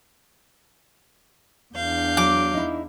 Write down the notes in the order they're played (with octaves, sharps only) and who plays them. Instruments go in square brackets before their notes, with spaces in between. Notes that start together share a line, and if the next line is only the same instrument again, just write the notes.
[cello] E2 D4 [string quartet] F5 G6
[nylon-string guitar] F#3 [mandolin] D6
[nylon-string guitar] D#4 E4